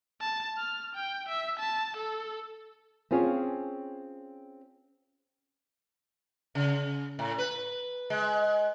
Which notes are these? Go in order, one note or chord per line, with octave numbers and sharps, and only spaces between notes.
A5
F6
G5
E5
A5
A4
C4 C#4 F4 G#4 C#5
C#3
A2
B4
G#3